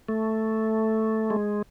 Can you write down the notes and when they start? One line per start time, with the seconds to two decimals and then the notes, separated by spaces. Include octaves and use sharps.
0.09 A3
1.30 G#3